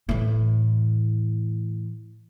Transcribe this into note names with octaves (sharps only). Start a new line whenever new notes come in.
A2 E3